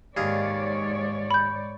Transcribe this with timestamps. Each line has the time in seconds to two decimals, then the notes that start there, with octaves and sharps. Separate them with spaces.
0.17 D#2 G#2 G#4 C#5 D5 F5
1.31 B5 G6